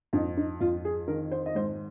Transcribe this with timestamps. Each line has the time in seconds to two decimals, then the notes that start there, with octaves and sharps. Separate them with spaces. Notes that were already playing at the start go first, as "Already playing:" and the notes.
0.13 F2 D#4
0.37 D#4
0.60 F2 F4
0.85 G#4
1.08 D#3 A#4
1.31 C5
1.46 D#5
1.55 G#2 C5